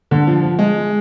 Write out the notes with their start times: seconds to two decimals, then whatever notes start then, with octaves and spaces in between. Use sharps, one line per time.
0.11 D3
0.27 F3
0.43 F3
0.59 G#3